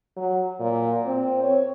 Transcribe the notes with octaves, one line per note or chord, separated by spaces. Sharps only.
F#3
A#2
C4
C#5